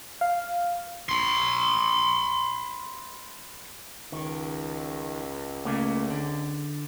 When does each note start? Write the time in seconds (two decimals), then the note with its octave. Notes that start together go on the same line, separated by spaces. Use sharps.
0.21 F5
1.09 B5 C6
4.12 C#2 D#3
5.65 C#3 A3 A#3
6.11 D3